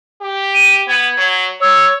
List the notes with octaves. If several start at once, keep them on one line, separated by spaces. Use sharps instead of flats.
G4
D#7
B3 G#6
F#3
C#5 E6